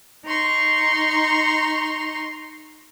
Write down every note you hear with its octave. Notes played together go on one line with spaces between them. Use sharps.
D#4 A#5 C6 C#6